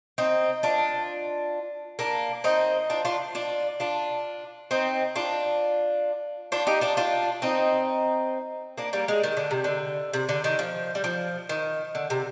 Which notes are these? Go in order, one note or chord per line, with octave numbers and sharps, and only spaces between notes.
C4 D#4
D4 F4
A#3 D4
C4 D#4
D4 F4
D4 F4
D4 F4
D4 F4
C4 D#4
D4 F4
D4 F4
D#4 G4
D4 F4
D4 F4
C4 D#4
A#3 D4
G3 A#3
G#3
D#3
D3
C3
D3
C3
D3
D#3
F3
G3
F3
D#3
D3
C3